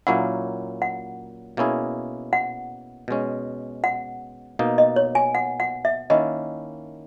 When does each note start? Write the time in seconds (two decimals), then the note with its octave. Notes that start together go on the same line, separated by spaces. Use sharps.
0.07 A#2 F#3 A#3 C#4 E4 F#5
0.82 F#5
1.57 B2 A#3 C#4 E4 G#4
2.33 F#5
3.08 B2 G#3 C#4
3.84 F#5
4.59 B2 A#3 D#4
4.78 D#5
4.96 C#5
5.15 G#5
5.35 F#5
5.60 F#5
5.85 E5
6.10 D#3 A#3 C#4 E4 D#5